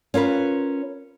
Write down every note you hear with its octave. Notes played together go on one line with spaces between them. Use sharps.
C#4 F4 A#4 B4